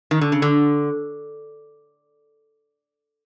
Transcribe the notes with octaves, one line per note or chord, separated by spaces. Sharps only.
D#3
D3
C#3
D3